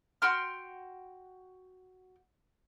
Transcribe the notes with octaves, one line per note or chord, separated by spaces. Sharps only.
F#4 G5 C6 F6